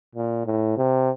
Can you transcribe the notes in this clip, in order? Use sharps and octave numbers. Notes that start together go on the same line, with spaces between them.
A#2
A2
C3